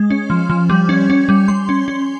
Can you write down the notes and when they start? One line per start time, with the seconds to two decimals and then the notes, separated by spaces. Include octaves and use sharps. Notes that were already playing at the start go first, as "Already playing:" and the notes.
Already playing: G#3
0.10 C#4
0.30 F3
0.50 F3
0.70 G3
0.89 C#4
1.10 C#4
1.29 G3
1.48 G3 C6
1.69 C#4
1.88 C#4